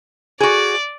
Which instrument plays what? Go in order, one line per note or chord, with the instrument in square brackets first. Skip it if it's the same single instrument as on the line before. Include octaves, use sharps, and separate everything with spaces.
[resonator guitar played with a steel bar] F#4 G#4 [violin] D5